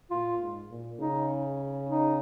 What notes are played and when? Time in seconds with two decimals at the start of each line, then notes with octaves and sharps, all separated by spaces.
0.11 A#2 F4
0.40 G#2
0.70 A#2
1.00 C#3 D#4
1.89 D#4